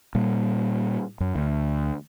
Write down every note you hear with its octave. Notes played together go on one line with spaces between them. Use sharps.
A#2 G3
F#2
D2